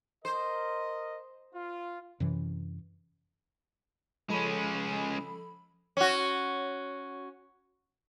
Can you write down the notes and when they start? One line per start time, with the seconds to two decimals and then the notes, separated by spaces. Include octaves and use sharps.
0.25 A#4 C5 D#5
1.54 F4
2.20 F#2 C3 E3
4.29 F3 G#3 C#4 A4 B5
5.97 C#4 F#4